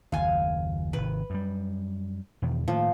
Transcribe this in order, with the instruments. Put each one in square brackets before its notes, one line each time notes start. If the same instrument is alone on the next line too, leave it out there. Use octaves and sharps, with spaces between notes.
[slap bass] F#1 D#2 [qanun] F5 G#5
[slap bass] G#1 C3 D#3 [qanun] B4
[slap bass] F#2 G3
E2 B2 D#3
[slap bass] A2 D#3 A#3 [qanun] F3